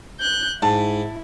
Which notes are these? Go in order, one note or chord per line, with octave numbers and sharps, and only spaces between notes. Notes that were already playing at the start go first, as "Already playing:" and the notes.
F#6 G6
G#2 E4 A5